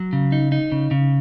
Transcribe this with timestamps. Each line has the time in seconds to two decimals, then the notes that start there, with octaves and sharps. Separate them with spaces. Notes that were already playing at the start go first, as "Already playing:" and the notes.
Already playing: F#3
0.13 C#3
0.32 D#4
0.52 D#4
0.72 C#3
0.91 C#3